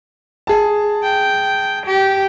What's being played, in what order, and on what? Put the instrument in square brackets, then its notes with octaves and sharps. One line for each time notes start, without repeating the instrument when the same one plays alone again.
[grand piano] G#4 A5
[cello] G5
G4